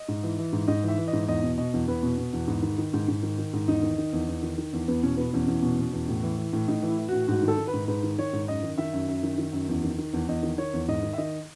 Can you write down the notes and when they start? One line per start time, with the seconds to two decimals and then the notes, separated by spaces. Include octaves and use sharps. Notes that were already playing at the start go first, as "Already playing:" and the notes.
Already playing: D#5
0.08 G#2
0.23 E3
0.38 E3
0.53 G#2
0.68 G#2 D#5
0.83 E3
0.88 E5
0.98 E3
1.08 D#5
1.13 G#2
1.28 E2 D#5
1.43 B2
1.58 B2 D#5
1.73 E2
1.88 E2 B4
2.03 B2
2.18 B2
2.33 E2
2.47 G#2
2.62 D#3
2.78 D#3
2.93 G#2
3.08 G#2
3.23 D#3
3.38 D#3
3.53 G#2
3.68 E2 D#4
3.83 D#3
3.98 D#3
4.13 E2
4.28 E2
4.43 D#3
4.58 D#3
4.73 E2
4.88 E2 B3
5.03 B2 C#4
5.17 B2 B3
5.33 E2 C#4
5.48 E2 C#4
5.63 B2
5.78 B2
5.93 E2
6.08 A2
6.23 E3
6.38 E3
6.53 A2
6.68 A2 D#4
6.82 E3
6.88 E4
6.98 E3
7.08 A2 F#4
7.28 G#2 F#4
7.42 D#3
7.48 A4
7.58 D#3
7.67 B4
7.74 G#2
7.88 G#2 B4
8.03 D#3
8.18 D#3 C#5
8.33 G#2
8.48 F#2 D#5
8.63 D#3
8.78 D#3 E5
8.93 F#2
9.08 F#2
9.23 D#3
9.38 D#3
9.53 F#2
9.68 E2
9.83 D#3
9.98 D#3
10.13 E2
10.28 E2 D#5
10.43 D#3
10.58 D#3 C#5
10.73 E2
10.88 G#2 D#5
11.03 D#3
11.13 E5
11.18 D#3 D#5